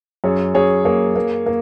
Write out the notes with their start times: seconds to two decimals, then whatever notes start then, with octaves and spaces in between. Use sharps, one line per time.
0.24 F#2 G#4 C#5
0.55 F#2 G#4 C#5
0.85 A#3 G#4 C#5
1.16 A#3
1.46 A#3